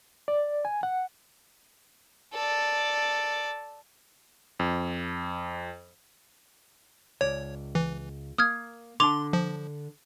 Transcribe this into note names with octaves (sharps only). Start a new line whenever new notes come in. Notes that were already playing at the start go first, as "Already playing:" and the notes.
D5
G#5
F#5
A4 D5
F2
C#2 C#5 D5
E3
A#3 D#6 F6 G#6
D3 D4 A5 C6 D6 F7
F3